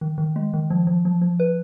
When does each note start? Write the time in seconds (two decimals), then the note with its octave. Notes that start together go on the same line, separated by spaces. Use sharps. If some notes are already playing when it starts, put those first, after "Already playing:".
0.01 D#3
0.18 D#3
0.36 G#3
0.54 D#3
0.70 F3
0.87 F3
1.05 F3
1.21 F3
1.40 B4